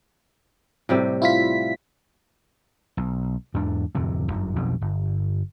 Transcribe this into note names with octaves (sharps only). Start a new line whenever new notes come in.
A2 C3 G3
E4 F4 B6
B1
E2 G#2 D4
D1 F2 C3
G1 F#2
B1 F2 B2
G1